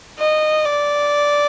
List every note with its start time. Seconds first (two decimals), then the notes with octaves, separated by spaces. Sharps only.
0.18 D#5
0.66 D5